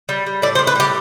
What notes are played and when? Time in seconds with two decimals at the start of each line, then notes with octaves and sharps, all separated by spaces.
0.09 G3
0.26 G3
0.42 A2 D5
0.55 C5
0.59 A2
0.67 B4
0.75 G3 G4